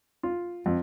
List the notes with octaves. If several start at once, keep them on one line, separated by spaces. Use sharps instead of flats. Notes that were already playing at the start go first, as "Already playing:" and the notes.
F4
F2